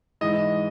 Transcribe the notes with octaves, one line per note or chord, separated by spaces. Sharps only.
G#2 E3 G#3 D#5